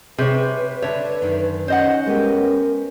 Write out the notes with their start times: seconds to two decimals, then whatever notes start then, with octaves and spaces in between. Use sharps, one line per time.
0.18 C3 G#4 B4 C#5
0.82 D3 C#5 E5
1.22 F#2 D#3
1.68 C#4 C5 D#5 F#5
2.06 G#3 B3 G4 A#4